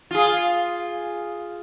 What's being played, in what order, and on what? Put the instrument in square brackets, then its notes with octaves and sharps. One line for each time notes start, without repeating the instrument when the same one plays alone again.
[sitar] F4 G#4